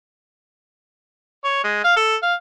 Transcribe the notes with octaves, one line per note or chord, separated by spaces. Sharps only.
C#5
G#3
F5
A4
F5